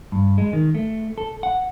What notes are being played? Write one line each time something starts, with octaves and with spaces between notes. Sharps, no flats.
G2
G#3
D#3
A3
A4
F#5